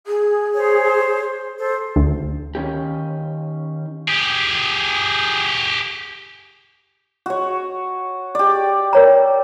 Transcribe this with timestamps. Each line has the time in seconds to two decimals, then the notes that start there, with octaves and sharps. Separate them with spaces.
0.06 G#4
0.55 C5 C#5
1.59 A4 C5
1.96 D2
2.55 D#3 C#4 G4
4.08 G4 G#4
7.26 F#4 C#5
8.35 G4 D5
8.93 A#4 C#5 A#5